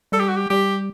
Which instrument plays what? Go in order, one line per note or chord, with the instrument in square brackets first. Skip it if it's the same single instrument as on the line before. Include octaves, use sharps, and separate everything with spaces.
[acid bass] G3 [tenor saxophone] A4
[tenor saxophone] G4
F#4
G4
[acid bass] G3 [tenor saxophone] G4